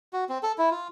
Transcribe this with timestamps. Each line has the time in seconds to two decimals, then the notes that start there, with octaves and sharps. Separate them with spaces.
0.13 F#4
0.29 C4
0.43 A4
0.58 E4
0.71 F4